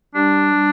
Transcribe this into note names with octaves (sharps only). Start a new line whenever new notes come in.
G3 D4
G3